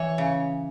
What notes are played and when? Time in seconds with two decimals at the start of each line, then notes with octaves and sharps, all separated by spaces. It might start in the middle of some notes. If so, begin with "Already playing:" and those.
Already playing: E3 C#5
0.18 C#3